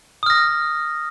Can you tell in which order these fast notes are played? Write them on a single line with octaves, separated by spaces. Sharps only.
D#6 F6 A#6